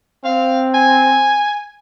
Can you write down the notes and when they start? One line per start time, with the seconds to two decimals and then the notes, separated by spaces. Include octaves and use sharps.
0.25 C4 F5
0.74 G#5